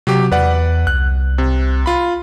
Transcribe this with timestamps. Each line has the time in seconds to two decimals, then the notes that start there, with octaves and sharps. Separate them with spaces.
0.07 C3 F#3 G4
0.32 E2 B4 D5 F#5
0.87 C2 F#6
1.38 C3
1.86 F4 B5